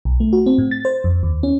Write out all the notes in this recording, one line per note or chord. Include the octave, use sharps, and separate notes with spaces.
B1
A3
F#4
C4
A2
A6
C5
F2
D#2
C#4